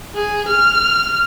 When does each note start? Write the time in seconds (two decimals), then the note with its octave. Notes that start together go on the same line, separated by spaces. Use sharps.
0.14 G#4
0.48 F6